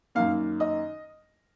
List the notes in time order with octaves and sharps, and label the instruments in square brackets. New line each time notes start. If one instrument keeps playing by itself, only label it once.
[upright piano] F#2 D#3 A#3 F5
D#5